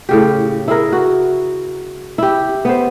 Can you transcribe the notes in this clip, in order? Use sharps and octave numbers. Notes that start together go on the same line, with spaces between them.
A2 C#3 G4
E4 G#4 A#4
F#4
E4 G4
B3 C5